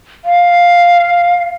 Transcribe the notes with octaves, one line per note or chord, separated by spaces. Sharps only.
F5